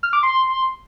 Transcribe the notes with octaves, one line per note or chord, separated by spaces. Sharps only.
F6
D6
C6